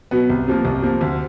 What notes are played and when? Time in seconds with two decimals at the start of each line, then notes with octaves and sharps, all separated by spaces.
0.11 B2 F#3 B3
0.30 C2
0.48 C3 F3 A#3
0.65 C2
0.83 C3 F3 A#3
1.01 D2